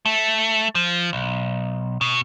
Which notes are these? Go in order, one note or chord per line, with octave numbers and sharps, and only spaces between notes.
A3
F3
B1
B2